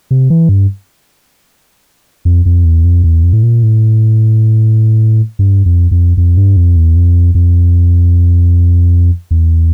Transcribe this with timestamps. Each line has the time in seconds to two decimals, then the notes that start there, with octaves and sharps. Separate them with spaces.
0.11 C3
0.30 E3
0.49 G2
2.25 F2
2.46 F2
2.65 E2
2.84 F2
3.04 E2
3.23 F2
3.33 A2
3.43 A#2
3.63 A2
5.39 G2
5.66 F2
5.91 F2
6.17 F2
6.37 G2
6.57 F2
6.76 E2
6.96 F2
7.35 F2
9.31 E2